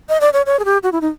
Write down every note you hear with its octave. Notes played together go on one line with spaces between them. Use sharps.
D#5
D5
C#5
C#5
G#4
G4
F#4
E4
D#4